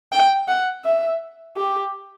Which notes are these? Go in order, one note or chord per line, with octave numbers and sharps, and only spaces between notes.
G5
F#5
E5
G4